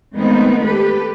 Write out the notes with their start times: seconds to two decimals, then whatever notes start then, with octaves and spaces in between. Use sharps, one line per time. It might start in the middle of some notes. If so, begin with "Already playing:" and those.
0.16 D#3 G#3 A3 B3 C4 D#4
0.62 G4 A4 B4